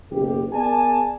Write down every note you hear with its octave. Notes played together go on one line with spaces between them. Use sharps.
F#1 B1 G4
B3 G#4 A#4 D5 G#5 A5